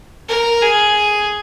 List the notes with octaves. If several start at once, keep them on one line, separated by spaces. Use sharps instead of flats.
A#4
G#4